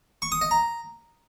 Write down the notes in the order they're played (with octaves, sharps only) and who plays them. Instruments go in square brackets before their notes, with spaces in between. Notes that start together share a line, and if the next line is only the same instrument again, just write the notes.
[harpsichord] C#6
D#6
D#5
A#5